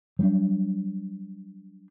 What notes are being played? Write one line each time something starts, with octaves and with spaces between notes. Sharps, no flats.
F#3 G3 D4